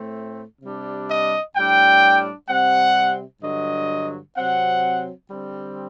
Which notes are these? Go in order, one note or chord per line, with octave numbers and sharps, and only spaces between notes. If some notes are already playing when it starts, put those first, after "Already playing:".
Already playing: A2 A3 C4
C3 G3 D4
D#5
A2 G3 D4 G5
C3 G3 C4 F#5
G2 D3 F#3 D#5
C3 F#3 C4 F#5
D3 G3 C4